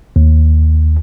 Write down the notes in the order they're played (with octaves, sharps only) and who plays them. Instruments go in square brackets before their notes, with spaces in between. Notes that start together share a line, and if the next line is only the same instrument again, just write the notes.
[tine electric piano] D#2